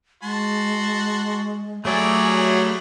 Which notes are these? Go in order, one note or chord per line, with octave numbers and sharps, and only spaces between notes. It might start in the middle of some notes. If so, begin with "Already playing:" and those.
G#3 F#4 A5 C6
F#3 G3 A3 E4 G#4 D5 G#5